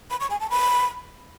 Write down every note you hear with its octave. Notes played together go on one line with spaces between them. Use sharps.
B5
C#6
G#5
A5
B5